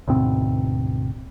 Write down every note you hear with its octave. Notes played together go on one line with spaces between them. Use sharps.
D2 G#2 B2 C4